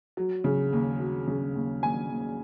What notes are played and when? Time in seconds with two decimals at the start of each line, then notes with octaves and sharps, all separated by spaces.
0.17 F#3
0.44 C#3
0.73 D#2
1.00 F#3
1.27 C#3
1.55 D#2
1.83 D#2 G#5
2.10 D#2